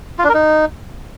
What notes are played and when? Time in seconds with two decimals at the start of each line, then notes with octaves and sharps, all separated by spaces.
0.19 F4
0.24 D4
0.29 A#4
0.34 D#4